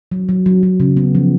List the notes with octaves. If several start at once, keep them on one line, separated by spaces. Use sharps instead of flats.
F#3
F#3
F#3
F#3
C#3
B3
F3